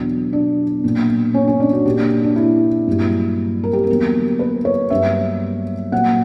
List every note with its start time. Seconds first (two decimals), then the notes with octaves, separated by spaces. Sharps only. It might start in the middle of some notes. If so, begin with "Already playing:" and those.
Already playing: E2 B2 F#3 D4
0.33 D4
0.84 A#2 F#3 A#3
1.34 C#4
1.48 C#4
1.60 D4
1.73 F#4
1.86 A#2 A#3 G4
1.98 D4
2.23 D4
2.36 E4
2.87 G2 F#3 A#3
3.63 A#4
3.73 G4
3.84 A#4
3.89 E2 D3 F#3 A#3
4.39 B4
4.65 C#5
4.90 G2 F#3 A#3 E5
5.92 A#2 F#3 A#3 F#5